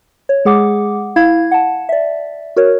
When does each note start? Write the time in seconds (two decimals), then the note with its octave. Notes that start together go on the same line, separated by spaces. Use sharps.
0.29 C#5
0.45 G#3 G#4 F#5 D6
1.16 E4 F5 G#6
1.51 F#5 A5
1.89 D5 E5
2.56 F#4 A#4 C#5